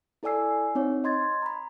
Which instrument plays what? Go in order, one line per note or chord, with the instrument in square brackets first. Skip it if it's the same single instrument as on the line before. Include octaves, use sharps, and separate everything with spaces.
[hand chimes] E4 A4 D5 G#5 E6 C7
C4 D#4 C#5
D#5 C6 G#6 A6
A#5 B5